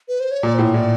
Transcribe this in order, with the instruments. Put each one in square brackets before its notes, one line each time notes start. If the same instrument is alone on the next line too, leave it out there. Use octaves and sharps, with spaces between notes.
[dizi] B4
C5
C#5
[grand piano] A#2 [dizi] D5
[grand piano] A2 [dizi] C5
[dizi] C#5
[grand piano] A2 [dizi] D5